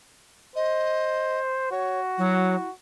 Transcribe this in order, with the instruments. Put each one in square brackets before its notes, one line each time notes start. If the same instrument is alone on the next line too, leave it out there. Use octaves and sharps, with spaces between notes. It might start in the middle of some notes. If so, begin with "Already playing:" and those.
[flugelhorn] C5 [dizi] D#5
[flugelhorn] F#4 [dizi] C#5
[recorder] F#3 [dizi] E4